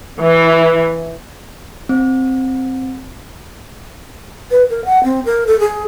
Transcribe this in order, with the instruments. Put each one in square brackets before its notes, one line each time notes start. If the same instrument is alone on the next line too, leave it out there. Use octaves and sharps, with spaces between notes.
[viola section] E3
[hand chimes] C4
[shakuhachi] B4
A#4
F#5
C4
A#4
A4
G#4